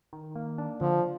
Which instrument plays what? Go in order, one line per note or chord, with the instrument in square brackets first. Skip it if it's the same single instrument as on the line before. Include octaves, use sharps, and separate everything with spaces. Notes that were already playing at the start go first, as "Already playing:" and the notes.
[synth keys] D#3
A#3
D4
[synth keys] D3 [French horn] F3